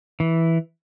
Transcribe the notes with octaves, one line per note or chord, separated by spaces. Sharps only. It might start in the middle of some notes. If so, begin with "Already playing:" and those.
E3